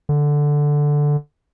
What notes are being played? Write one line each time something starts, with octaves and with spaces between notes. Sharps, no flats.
D3